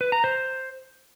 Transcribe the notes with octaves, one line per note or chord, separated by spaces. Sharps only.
B4
A#5
C5